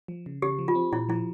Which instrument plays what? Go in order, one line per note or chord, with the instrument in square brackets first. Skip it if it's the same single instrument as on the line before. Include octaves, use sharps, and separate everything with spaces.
[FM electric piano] F3
C#3
[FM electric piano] C#3 [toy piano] G4
[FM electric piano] F3
[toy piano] F4
[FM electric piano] C4
[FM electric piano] A#2 [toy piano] E4
[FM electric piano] F3 [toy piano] E4